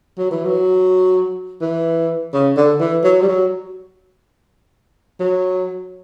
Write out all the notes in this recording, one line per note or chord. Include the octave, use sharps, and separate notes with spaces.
F#3
E3
F#3
E3
C#3
D3
E3
F#3
G3
F#3
F#3